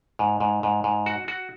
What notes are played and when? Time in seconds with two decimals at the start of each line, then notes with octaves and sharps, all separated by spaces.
0.19 G#2
0.40 G#2
0.63 G#2
0.84 G#2
1.06 F#4
1.28 F#4